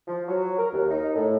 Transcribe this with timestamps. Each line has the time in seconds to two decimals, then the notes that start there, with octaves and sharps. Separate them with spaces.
0.08 F3
0.28 F#3
0.58 A#4
0.73 D#2
0.90 D#4
1.15 A2